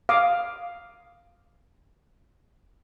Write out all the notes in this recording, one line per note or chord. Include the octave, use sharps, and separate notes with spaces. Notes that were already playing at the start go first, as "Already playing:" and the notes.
F5 D6 D#6